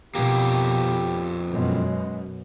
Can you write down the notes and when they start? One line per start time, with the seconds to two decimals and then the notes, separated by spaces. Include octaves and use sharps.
0.15 F2 B2 A#3 G4
1.50 F#2 B2 G#3